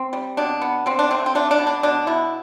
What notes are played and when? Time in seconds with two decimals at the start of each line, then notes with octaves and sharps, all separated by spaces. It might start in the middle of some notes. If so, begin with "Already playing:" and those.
Already playing: C4
0.13 G3
0.37 B2 D4
0.61 B3
0.86 D3 C4
0.99 D4
1.11 A3 C4
1.26 C4
1.35 A3 D4
1.51 D4
1.59 B2
1.67 D4
1.83 B2 D4
2.07 B2 E4